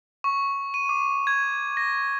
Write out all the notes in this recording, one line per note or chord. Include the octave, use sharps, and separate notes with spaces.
C#6
D#7
D6
G#6
A#6